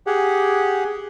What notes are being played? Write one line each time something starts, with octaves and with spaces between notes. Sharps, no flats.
G4 G#4 F#5